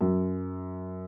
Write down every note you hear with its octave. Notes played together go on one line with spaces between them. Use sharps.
F#2